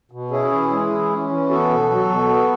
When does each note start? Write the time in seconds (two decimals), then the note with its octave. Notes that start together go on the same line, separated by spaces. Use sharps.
0.11 B2
0.31 C#4 E4 G#4
0.51 E3
0.71 G#3
0.90 E3
1.10 C#4
1.30 E3
1.49 B3 F#4 A4
1.69 B2
1.90 F#3
2.09 B2
2.29 B3